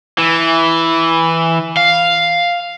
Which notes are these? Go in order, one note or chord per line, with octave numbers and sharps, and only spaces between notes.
E3
F5